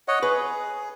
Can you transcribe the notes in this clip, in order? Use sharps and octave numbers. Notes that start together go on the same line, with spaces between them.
C#5 D#5 F#5
G#4 B4